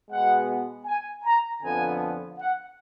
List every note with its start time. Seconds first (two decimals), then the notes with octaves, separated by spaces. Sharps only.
0.10 B2 G#3 B3 F#5
0.86 G#5
1.25 A#5
1.62 F2 D3 F3 B3 G#5
2.39 F#5